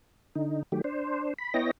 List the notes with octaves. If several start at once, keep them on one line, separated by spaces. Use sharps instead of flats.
D3 D#4
D#3 F#3 A3 G4
D4 C5
B5
B3 E4 C#5 D#5 G5 A#6